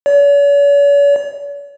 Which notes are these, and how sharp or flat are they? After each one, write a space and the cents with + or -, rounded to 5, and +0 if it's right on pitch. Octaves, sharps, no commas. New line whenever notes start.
C#5 +45